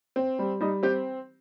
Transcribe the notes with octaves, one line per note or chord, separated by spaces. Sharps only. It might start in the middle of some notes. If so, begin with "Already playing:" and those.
C4
G3
G3 D#4
C4 G4